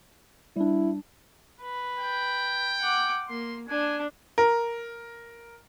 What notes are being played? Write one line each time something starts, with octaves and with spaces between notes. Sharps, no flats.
G3 D4 E4
B4
G5
F#5 D6
A#3 C6
D4 G#5 A5
A#4